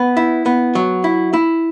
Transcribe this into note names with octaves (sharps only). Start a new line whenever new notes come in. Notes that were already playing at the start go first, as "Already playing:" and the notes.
Already playing: B3
E4
B3
F#3
E4
E4